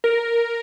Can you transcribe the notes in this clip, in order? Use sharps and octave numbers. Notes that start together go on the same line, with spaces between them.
A#4